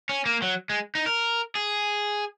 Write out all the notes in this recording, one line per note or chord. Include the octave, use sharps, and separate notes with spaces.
C#4
A#3
F#3
G#3
D#4
A#4
G#4